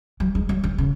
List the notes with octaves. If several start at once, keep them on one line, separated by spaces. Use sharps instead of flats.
F#3
G#3
F#3
D#3
C#3